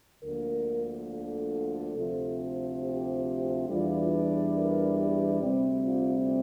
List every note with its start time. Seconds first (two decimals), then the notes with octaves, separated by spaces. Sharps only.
0.22 D2 D3 F3 A#3 A#4
1.09 A4
1.95 D2 C3 F3 C4
2.81 G4
3.67 E2 E3 G3 D4 F4
4.54 A#4
4.97 G4
5.40 D2 C3 G3 C4
5.83 F4